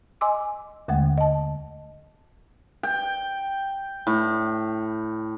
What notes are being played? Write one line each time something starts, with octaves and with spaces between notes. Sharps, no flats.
D#5 G#5 C6 D6 E6
D#2 D3 G#3 A3 F#5
D#5 A5
G5
A2